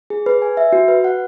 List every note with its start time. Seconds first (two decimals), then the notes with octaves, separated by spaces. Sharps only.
0.10 G#4
0.26 B4
0.42 G#5
0.57 E5
0.73 F#4
0.88 B4
1.04 F#5